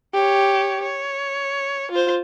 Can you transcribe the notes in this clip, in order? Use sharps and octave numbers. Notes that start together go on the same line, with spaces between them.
G4 C#5
C#5
F4 C5